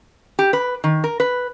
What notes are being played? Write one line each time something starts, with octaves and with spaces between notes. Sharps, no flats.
G4
B4
D#3
A#4
B4